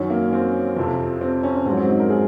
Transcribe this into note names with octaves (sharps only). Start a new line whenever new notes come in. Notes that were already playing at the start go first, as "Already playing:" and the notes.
Already playing: F#2 D#3 F#3 C#4
A#3
C4
F2 C3 F3
C4
C#4
G#2 F#3 C4
C4
D#4
A#4
G#4